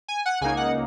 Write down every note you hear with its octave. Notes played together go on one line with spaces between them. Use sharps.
G#5
F#5
C#2 C#3 A#3 D#4 G#5
F#5